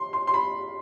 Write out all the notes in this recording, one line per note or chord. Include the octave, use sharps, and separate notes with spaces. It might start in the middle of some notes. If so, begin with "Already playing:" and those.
Already playing: C6
C6
C6
B5